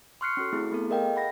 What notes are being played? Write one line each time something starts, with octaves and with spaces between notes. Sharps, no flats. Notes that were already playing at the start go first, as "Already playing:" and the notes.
C6 C#6 F6 F#6 C7 C#7
C#4 F#4 A4
A3 C4 E4 G#4
A3 B3 A4
G#4 A#4 D#5 F5 G5
F#5 B5 A#6